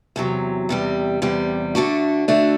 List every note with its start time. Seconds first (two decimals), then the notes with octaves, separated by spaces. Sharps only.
0.16 E2 C3 F#3
0.69 E2 C3 G3
1.22 E2 C3 G3
1.75 D3 A3 D4 F#4
2.28 D3 A3 D4 F#4